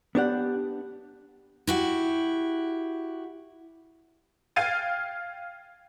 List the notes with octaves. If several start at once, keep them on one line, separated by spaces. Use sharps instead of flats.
B3 D4 G4 F#5
E4 F#4 G4
F5 G5 F6 G#6 A6 D#7